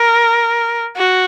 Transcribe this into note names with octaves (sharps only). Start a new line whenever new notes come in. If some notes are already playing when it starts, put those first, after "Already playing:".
Already playing: A#4
F#4